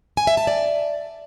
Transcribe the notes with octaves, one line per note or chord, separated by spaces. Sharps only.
G#5
E5
A5
D5